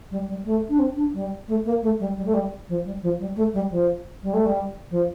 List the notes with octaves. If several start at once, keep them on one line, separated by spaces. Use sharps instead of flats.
G3
G3
A3
D4
C4
D4
G3
A3
A#3
A3
G3
G3
A3
G3
F3
G3
F3
G3
A3
G3
F3
G3
A3
G3
F3